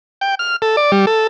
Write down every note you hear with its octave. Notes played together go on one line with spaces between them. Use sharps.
G5
F6
A4
D5
G3
A4